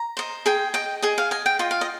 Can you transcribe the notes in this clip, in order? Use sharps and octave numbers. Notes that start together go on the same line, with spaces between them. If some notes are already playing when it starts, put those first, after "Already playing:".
Already playing: A#5
C5 D#5
G#4 G5
D#5 G5
G#4 D#5
F5
D#5 G#5
G5
F4 D#5
F5
D#5